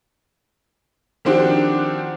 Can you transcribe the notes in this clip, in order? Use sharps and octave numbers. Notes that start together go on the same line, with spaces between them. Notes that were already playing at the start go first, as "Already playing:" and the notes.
D#3 F3 C4 D4 F#4 G4